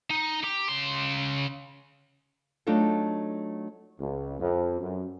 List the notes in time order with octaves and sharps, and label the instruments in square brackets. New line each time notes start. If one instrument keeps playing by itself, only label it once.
[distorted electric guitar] D#4
G4
C#3 C6
[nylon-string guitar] F#3 A3 D4 D#4 F4 A4
[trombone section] C#2
F2
F#2